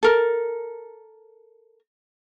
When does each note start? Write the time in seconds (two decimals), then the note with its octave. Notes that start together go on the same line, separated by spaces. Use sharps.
0.03 A4 A#4